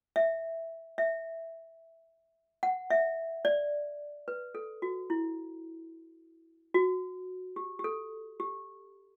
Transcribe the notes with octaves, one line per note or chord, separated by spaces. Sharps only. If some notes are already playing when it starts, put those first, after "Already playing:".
E5
E5
F#5
E5
D5
B4
A4
F#4
E4
F#4
G4
G4
A4
G4